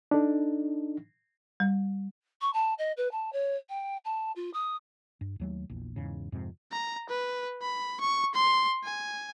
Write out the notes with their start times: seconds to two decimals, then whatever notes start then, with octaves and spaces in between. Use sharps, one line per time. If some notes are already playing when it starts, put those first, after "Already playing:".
0.11 D4 D#4 A4
1.60 G3
2.41 C#6
2.53 A5
2.78 D#5
2.97 B4
3.11 A5
3.32 C#5
3.69 G5
4.05 A5
4.36 F4
4.53 D#6
5.21 G2
5.40 D#2 F#3 A3
5.70 A#1 E2
5.96 E2 G#2 C#3
6.32 F2 G#2 C3
6.72 A#5
7.09 B4
7.62 B5
8.00 C#6
8.34 C6
8.84 G#5